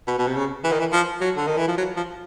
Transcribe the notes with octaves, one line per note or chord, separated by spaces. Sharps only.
B2
B2
C3
C#3
E3
D#3
E3
F3
F#3
D3
D#3
E3
F3
F#3
F3